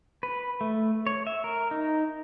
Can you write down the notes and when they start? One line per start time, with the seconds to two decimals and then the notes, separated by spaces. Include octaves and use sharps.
0.23 B4
0.61 A3
1.07 C#5
1.27 E5
1.44 A#4
1.71 D#4